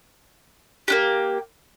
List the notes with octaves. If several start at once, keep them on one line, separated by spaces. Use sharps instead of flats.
A#3 D4 G4